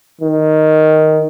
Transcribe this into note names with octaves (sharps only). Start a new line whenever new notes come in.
D#3